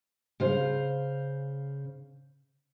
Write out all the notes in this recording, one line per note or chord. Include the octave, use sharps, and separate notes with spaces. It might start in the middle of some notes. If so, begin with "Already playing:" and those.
C#3 C5 F5